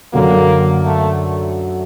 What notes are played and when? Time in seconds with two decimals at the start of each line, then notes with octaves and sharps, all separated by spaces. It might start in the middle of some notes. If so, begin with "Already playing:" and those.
0.13 F#2 D3 F#3 A#3
0.85 A3